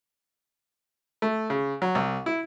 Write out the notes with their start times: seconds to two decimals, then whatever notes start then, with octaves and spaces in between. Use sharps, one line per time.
1.22 A3
1.50 C#3
1.82 F#3
1.95 C2
2.26 E4